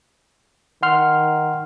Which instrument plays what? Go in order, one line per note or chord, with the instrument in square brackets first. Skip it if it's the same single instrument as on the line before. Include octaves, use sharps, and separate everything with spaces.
[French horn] D#3 [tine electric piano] F#5 C6 F6